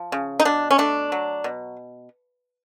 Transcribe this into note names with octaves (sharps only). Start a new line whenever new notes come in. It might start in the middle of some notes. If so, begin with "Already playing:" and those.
Already playing: F3
C#3
D#4
B2 D4
C#4
A3 D4
F#3
B2